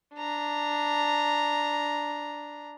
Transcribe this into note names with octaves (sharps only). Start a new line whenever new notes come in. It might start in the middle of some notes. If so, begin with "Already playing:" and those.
D4 A#5